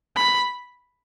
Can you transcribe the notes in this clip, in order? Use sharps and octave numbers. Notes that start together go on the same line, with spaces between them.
B5